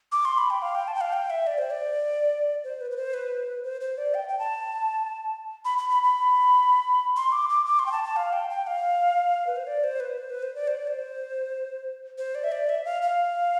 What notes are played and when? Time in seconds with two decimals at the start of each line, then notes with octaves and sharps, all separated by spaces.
0.12 D6
0.25 C6
0.38 B5
0.50 G5
0.62 F5
0.75 G5
0.88 A5
0.95 G5
1.01 F5
1.13 G5
1.30 E5
1.47 D5
1.58 C5
1.71 D5
2.64 C5
2.81 B4
2.91 B4
2.97 C5
3.14 B4
3.64 C5
3.81 C5
3.98 D5
4.14 G5
4.28 G5
4.39 A5
5.65 B5
5.78 B5
5.90 B5
6.03 B5
7.16 C6
7.32 D6
7.50 D6
7.66 D6
7.79 C6
7.86 G5
7.92 A5
8.04 A5
8.16 F5
8.33 G5
8.50 G5
8.67 F5
9.47 B4
9.56 C5
9.67 D5
9.84 C5
10.00 B4
10.18 C5
10.30 B4
10.43 C5
10.55 D5
10.67 C5
10.77 D5
10.87 C5
12.18 C5
12.35 D5
12.44 E5
12.52 D5
12.69 E5
12.85 F5
13.02 F5